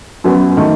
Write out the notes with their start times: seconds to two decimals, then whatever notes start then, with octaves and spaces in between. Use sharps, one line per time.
0.24 F#2 F#3 B3
0.57 D#3 A3